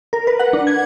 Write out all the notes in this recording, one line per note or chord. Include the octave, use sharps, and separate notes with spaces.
A#4
B4
F#5
D4
G#6